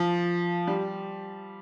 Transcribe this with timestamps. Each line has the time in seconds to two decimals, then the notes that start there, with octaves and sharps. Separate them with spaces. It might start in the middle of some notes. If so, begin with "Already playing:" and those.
Already playing: F3
0.67 G3